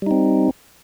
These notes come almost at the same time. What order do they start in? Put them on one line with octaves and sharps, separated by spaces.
G3 D#4 C4